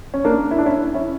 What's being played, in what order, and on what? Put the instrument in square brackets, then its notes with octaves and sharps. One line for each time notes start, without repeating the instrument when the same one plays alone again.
[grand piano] C#4
A#3 D4
E4
D4
C#4 E4
C#4 E4